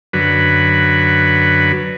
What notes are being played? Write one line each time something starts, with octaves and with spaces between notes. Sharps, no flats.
F#2 D3 F#3 B4